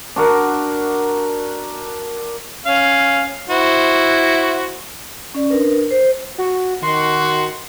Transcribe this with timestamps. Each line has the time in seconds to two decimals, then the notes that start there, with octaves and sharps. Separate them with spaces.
0.16 D4 F#4 A#4
2.66 C#4 F5
3.49 E4 F#4 C5
5.35 C#4 D5
5.50 D4 A#4 B4
5.91 C5
6.38 F#4
6.83 D#3 F#4 C6